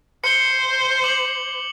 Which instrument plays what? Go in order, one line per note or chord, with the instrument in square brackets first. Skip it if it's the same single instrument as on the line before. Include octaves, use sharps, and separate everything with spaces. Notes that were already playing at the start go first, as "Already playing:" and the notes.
[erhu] C5 [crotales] C#7 G7
[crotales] D6 F#7